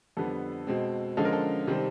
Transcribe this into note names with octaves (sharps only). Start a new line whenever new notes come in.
F2 D3 G3 B3 A4
B2 G#3 C4
D3 F3 G#3 C#4 A4
A#4
A4
C3 D#3 G3 C4